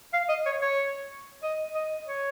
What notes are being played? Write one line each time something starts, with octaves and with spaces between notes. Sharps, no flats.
F5
D#5
C#5
C#5
D#5
D#5
C#5